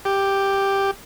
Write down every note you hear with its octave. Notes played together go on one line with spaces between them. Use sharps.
G4